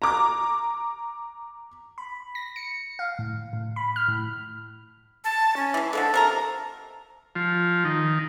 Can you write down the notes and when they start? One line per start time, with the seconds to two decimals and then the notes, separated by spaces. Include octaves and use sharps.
0.02 A#5 D6
1.98 B5
2.35 A#6
2.56 C#7
2.99 F5
3.19 A2
3.53 A2
3.76 B5
3.96 F6
4.08 A2
5.24 A5
5.56 C#4
5.74 E3 G#3
5.93 D3 F3 G#3 A4
6.14 C3 A#4 A#5
7.35 F3
7.85 D#3